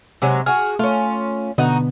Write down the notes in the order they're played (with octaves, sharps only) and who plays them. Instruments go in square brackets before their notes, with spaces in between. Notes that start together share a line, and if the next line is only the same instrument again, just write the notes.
[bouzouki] C3 F#3 G#3
[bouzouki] F#4 G#4 [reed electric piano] F6
[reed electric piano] A3 [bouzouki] C#4 F4
[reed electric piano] B2 D3 B3 [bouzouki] D#4 F#4